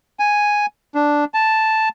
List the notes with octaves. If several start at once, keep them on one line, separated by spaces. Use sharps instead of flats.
G#5
D4
A5